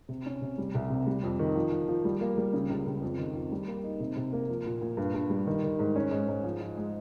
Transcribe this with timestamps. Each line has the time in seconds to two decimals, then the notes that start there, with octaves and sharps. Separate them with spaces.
0.09 C3
0.26 C#4
0.42 C3
0.58 G3
0.75 C2
0.90 C3
1.07 G3
1.24 F2
1.39 D#3
1.55 F3
1.72 F3
1.88 F3
2.05 G3
2.21 A#3
2.38 G3
2.53 C#3
2.70 C#2
2.86 C#2
3.02 F2
3.18 D#3
3.35 F2
3.52 G3
3.68 A#3
3.84 D#4
4.00 C3
4.16 C3
4.33 A#3
4.49 F3
4.66 A#2
4.82 A#2
4.97 G2
5.14 G2
5.30 G3
5.47 D#3
5.64 D#3
5.79 G#2
5.96 C#4
6.11 G#2
6.28 G#2
6.44 F3
6.61 F3
6.77 G#3